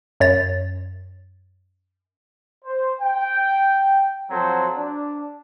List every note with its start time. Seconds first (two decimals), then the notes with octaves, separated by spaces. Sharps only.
0.20 F#2 C#5 A6
2.65 C5
3.01 G5
4.31 F3 F#3 C4 F#4 A4 C5
4.76 D4